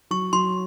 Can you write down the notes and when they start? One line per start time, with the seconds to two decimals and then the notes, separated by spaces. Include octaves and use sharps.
0.11 F#3 C#6
0.33 F#3 C6